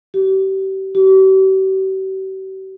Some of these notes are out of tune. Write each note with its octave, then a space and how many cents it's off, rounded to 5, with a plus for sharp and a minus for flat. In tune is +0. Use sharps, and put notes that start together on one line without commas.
G4 -35
G4 -45